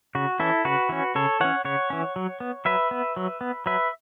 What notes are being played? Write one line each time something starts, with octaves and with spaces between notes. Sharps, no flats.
C#3 F#4
E3 C#4 E4 A4
C#3 F#4 B4
E3 C#4
C#3 A4 C#5
E3 C#4 C#5 F#5
C#3 C#5 F#5
E3 C#4
F#3
B3
F#3 B4 E5
B3
F#3
B3
F#3 B4 E5